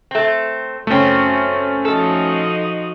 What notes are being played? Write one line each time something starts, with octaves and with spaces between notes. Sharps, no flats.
A3 C4
F#2 C#3 A3 C4 C#4
F3 D#4 F#4 A4